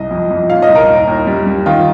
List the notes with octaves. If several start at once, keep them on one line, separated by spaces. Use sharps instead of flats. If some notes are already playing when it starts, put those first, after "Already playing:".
Already playing: C2 D#5
F2
F2
A#2 F5
D#5
C2
A#4
D#2
D#2
G3
G3
D#3 F4